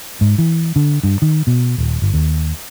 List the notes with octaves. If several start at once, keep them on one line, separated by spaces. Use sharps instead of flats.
G#2
E3
D3
G2
D#3
B2
D#1
G1
D#2